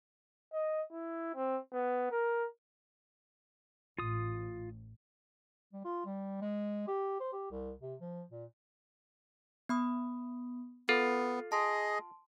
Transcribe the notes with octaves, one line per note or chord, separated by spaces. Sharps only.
D#5
E4
C4
B3
A#4
A1 A2 F4 D#6
G3
F4
G3
G#3
G4
C5
G4
C2
C3
F3
A#2
B3 B5 D#6
B3 F4 A4
G#4 D#5 A5 C6